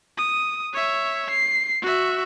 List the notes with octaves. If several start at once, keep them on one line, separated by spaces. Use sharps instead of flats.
D#6
C#5 E5
C7
F#4 E5